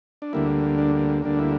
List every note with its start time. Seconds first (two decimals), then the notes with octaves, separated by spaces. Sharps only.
0.22 D4
0.33 D2 D3 G3 A#3 E4
0.78 D4
1.22 D2 D3 G3 A#3 D4
1.39 E4